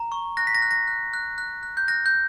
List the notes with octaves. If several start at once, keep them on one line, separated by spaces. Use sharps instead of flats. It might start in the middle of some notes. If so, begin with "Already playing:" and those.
Already playing: A#5
C#6
F#6 A#6
B6
A#6
F#6
A#6
F#6
F#6
F#6
F#6
G6
F#6 A#6
G6